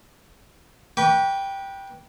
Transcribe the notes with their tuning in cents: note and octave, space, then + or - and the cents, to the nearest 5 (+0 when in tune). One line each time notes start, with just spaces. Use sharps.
B4 -20 G5 +0 C#6 +45